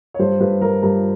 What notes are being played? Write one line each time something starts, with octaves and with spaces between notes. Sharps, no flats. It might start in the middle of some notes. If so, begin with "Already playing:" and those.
C#5
G2 C5
G2 B4
G2 A#4
G2 A#4